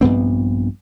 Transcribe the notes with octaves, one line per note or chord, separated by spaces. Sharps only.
A#1 G2 B3 C4